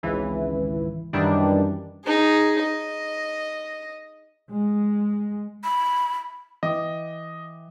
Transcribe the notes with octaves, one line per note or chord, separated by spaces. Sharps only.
G#1 C#2 E3
F#2 D#3 E3 G3 D4
D#4 G#4
D#5
G#3
B5
E3 D#5 G5 D6